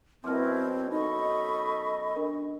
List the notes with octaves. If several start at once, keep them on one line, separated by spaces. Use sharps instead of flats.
F#2 B2 C4 E4 A#4 C6 F6
D#4 A4 D#5 B5 C#6
D4 A#4